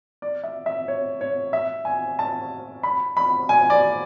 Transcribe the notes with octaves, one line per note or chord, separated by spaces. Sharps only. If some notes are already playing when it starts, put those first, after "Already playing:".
D5
E5
E5
C#5
C#5
E5
G#5
A5
B5
B5
G#5
D5